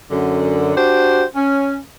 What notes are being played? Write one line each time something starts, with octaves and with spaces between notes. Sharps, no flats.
F#2 D3
D4 F#4 G4 C5
C#4